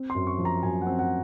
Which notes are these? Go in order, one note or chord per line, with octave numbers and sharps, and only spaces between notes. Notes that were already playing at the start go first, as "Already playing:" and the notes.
Already playing: C4
C6
F#2
C#6
F3
A#5
F#2 G#5
F#5
C4
F#5